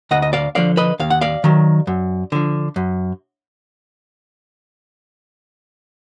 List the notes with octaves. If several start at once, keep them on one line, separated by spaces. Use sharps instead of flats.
D2 D#5 F#5
D#5
D5 F5
D3 F3 D5 F5
B4 D#5
D#2 F5
F#5
D5 F5
D#3 F#3
F#2
D3 F3
F#2